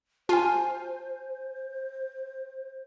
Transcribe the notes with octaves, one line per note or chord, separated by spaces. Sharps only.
F4 C5 G#5 A5